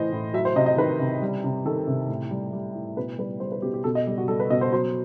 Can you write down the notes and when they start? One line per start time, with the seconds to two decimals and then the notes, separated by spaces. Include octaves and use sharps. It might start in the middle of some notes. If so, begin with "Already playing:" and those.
Already playing: A2 E3 C5 D#5
0.12 A2
0.34 F#3 E5
0.45 C5
0.56 C3 D#5
0.66 D#5
0.77 D#3 B4
1.00 C3
1.22 G3
1.44 C3
1.65 D#3 A4
1.87 C3
2.09 A2
2.31 G3
2.53 G3
2.75 A2
2.97 B2 B4
3.18 G3 B4
3.40 G3 C5
3.52 B4
3.62 B2 G4
3.74 G4
3.84 B2 A4
3.95 D#5
4.07 G3 G4
4.18 F#4
4.28 G3 A4
4.40 B4
4.50 B2 D#5
4.61 C5
4.72 F#3 C5